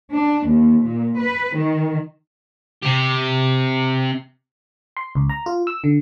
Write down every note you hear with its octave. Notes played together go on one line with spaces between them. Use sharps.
D4
D#2
A#2
B4
D#3
C3 G4
C6
C#2
A#5
F4
E6
D3